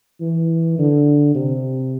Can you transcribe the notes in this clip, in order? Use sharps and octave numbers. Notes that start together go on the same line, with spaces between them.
E3
D3
C3